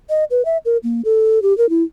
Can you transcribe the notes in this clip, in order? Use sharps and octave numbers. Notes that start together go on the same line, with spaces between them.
D#5
B4
E5
A#4
A#3
A4
G4
A#4
E4